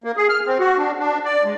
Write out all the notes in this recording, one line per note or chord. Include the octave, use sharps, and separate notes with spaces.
A#3
G#4
F6
C4
F#4
D4
D4
D5
G#3